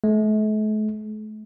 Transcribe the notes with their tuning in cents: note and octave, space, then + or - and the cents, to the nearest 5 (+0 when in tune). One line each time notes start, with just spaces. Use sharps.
A3 -45